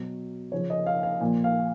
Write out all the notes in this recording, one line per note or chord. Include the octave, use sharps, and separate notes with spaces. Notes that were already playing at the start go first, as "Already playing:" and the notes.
Already playing: B2 F#3
C#3 F3 C#5
D#5
F5
F5
A#2 F3
F5